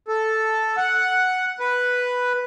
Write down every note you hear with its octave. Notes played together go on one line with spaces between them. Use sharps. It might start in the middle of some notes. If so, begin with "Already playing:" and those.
A4
F#5
B4